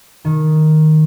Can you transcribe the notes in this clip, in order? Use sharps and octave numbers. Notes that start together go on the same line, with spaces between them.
D#3